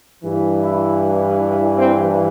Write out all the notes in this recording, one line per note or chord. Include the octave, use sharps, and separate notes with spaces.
G2 E3
E4
C4